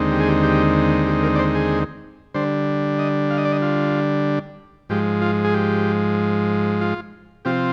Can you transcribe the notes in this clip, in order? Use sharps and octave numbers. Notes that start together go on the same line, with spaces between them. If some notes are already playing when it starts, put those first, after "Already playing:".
Already playing: D#2 D3 G#3 C4 D#4
G4
G#4
G4
G4
G4
A#4
D5
C5
G#4
D3 G3 D4 C5
D#5
F5
D#5
D5
D#5
F4
G#2 F3 G#3 G4
F4
G#4
G4
F4
C3 F3 C4 F4 G4